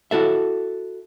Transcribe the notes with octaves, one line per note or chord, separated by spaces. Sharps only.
E4 F#4 A4 E5